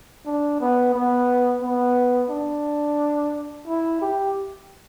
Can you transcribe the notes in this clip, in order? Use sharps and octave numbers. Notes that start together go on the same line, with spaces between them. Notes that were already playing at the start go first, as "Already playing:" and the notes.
D4
B3
B3
B3
D4
E4
G4